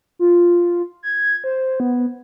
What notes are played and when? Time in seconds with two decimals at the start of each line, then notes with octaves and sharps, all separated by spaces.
0.19 F4
1.03 G#6
1.44 C5
1.80 B3